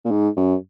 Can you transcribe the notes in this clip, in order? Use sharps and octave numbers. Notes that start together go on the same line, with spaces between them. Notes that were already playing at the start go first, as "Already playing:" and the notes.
A#2
G#2
F#2